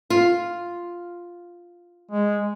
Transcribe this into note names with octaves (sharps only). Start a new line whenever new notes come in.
F4
G#3